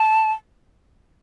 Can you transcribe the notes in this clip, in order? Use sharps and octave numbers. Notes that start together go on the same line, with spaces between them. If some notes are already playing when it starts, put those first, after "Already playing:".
Already playing: A5